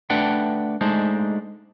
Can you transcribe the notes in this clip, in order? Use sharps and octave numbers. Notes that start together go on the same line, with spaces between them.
A3 D4 B4 D5 F#5 G5
G#3 A3 D4 D#4 C5